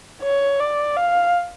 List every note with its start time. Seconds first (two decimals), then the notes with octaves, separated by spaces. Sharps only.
0.23 C#5
0.60 D5
0.96 F5